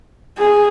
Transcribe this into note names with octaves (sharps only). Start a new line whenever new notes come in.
G#4